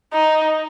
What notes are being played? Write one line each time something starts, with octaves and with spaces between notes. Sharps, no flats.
D#4